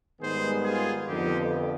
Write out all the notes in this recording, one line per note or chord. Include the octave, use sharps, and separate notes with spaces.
G#2 D#3 G3 B3 G#4 C5
F4 G#4
F2 D3 F3 B3 D#4 G4